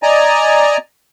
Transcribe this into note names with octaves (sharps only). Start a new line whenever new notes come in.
D5 D#5 G#5 A#5